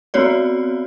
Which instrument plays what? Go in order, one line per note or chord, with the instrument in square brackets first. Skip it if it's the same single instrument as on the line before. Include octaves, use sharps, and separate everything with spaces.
[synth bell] B3 C4 F#4 C#5 D5